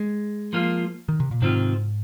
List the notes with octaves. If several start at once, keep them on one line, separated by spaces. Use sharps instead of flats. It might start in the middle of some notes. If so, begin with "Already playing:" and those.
Already playing: G#3
F3 A#3 F4
D#3
C3
A#2
G#2 C3 D#3 C4 F4